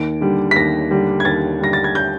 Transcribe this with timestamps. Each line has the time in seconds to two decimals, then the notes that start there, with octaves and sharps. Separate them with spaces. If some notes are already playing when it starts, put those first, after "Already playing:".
Already playing: D#2 D7
0.21 D3 G3
0.51 B6
0.56 D#2 A#6
0.91 D3 G3
1.20 G#6
1.25 D#2 A6
1.60 D3 G3 A#6
1.73 A6
1.84 G#6
1.95 G6